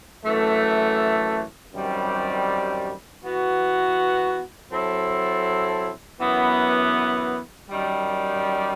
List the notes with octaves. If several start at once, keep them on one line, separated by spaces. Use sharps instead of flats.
F#2 E3 A3
F#2 D#3 G3 C4
E3 B3 F#4
F#3 C4 E4 A4
F#2 E3 B3
F#2 D#3 G3